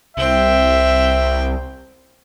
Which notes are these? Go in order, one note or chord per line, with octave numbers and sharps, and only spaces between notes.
C2 C4 E5 G5